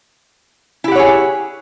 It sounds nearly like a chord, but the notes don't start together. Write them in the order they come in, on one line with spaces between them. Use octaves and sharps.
E4 G4 F#5 C#5 G#4